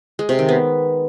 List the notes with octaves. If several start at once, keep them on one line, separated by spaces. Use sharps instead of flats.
G#3
C3
D#3
B3